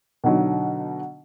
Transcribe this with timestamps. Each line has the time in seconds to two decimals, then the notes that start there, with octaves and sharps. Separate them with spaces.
0.24 B2 D3 F#3 D#4